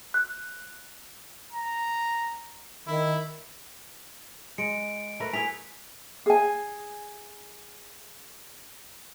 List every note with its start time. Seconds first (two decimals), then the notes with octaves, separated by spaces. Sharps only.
0.14 F#6
1.53 A#5
2.87 D#3 E4
4.58 G#3 C#7 D7
5.20 A3 A#4 B4
5.33 A3 E4 G#4 G#5 B6 F7
6.26 G#4 G#5